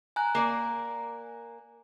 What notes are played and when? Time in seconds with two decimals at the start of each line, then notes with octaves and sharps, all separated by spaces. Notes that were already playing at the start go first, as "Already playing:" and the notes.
0.16 G#5 A#5 F#6
0.35 A#3 A#4 D5